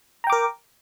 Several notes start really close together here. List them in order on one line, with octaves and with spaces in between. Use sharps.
A#5 G5 D6 A#4